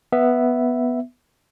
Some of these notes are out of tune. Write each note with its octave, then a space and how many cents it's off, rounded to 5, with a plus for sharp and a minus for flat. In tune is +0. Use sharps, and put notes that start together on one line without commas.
B3 +0 E5 +0